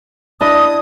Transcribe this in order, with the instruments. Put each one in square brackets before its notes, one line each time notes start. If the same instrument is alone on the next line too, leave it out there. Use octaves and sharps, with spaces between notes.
[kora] D4 E4 D#5 [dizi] D#6